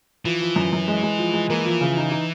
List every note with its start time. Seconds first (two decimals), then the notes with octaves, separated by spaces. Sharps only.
0.25 E3 F3
0.41 F3
0.56 F#2
0.73 F#2
0.88 G#3
1.03 G#3
1.18 F3
1.34 G#3
1.49 E3 A#3
1.65 F3
1.81 C#3
1.97 D#4
2.11 D#4